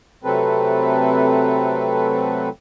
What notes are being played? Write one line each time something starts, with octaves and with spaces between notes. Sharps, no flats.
C3 F#3 A3 C4 A4 B4